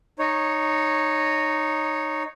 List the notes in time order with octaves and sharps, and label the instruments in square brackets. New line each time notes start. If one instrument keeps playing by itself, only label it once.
[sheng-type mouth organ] D#4 C#5